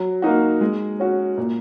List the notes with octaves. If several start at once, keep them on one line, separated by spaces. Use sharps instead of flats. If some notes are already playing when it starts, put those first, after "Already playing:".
Already playing: F#3
A#3 D#4 F#4
G#3
C#4 F#4
A#2